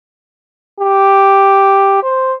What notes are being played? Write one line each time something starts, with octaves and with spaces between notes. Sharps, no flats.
G4
C5